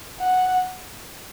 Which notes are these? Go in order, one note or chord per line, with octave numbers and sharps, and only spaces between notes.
F#5